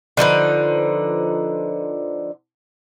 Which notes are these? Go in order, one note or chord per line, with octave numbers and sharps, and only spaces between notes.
D3 F3 D#4 B4